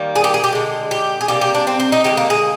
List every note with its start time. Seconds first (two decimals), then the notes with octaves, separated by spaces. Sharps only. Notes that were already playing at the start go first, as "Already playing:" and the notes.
Already playing: D#3 G3 A#3
0.15 G#4
0.24 G4
0.34 G#4
0.44 G4
0.52 D3 G#3
0.91 G4
1.21 G#4
1.28 C3 G3 A#3 G4
1.41 G4
1.54 D4
1.67 C4
1.80 C4
1.92 D#4
2.04 D3 F3 G4
2.09 G#3
2.17 A#3
2.30 G#4